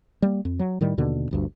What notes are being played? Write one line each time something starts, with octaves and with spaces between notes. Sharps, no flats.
G3 A#3
F2
F#3
A2 D#3 G3
D#2 B2 D3
G1 D2 G2